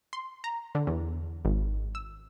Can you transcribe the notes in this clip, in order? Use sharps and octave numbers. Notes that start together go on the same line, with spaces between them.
C6
A#5
D3
E2
G#1
E6